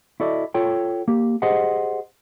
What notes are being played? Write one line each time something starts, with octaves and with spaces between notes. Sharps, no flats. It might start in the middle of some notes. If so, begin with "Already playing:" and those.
E4 F#4 A4 D5 D#5
F4 A4 C#5 G5
A#3 G4
G4 G#4 C5 D#5 F#5